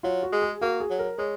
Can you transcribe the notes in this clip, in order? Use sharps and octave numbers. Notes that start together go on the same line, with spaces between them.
F#3 F4
F#4
G#3
G#4
A#3 F#4
G#4
F#3
A#4
G#3 C#5